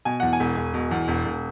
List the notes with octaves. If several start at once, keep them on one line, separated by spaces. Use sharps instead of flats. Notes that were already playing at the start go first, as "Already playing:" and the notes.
B2 G#5
E2 F#5
G#5
E1
E1
B2
E2
E1
E1